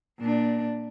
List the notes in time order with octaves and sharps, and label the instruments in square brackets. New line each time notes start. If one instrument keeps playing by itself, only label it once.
[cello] A#2 D4